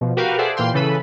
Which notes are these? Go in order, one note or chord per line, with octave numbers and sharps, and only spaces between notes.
B2 F3
F#4 G4 A#4 B4 F5
G#4 A4 C5 D5 E5 F#5
A#2 E3 F5 G5 C6
C#3 E3 A4 B4 B5